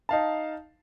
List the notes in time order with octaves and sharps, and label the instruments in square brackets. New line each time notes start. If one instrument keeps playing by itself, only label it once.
[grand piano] D#4 F5 A5